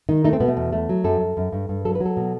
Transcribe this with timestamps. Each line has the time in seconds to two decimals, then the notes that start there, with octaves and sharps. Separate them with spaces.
0.09 D#3 D#4
0.24 A3 D#4
0.33 C4
0.40 B2 B3
0.48 A3
0.57 E2
0.73 A3
0.89 F#3
1.04 F#2 A4
1.20 F#2
1.37 F#2
1.52 G2
1.69 G2
1.85 F#3 A4
1.95 B4
2.01 F#3 A4
2.17 B2